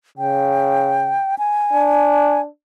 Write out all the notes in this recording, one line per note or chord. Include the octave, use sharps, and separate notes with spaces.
C#3 G5
G#5
D4